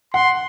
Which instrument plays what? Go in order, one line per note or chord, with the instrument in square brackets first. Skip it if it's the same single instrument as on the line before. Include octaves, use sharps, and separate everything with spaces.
[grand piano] F#5 [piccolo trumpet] C6